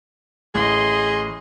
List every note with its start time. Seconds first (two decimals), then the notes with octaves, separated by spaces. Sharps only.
0.55 A1 G#4 D#5 C6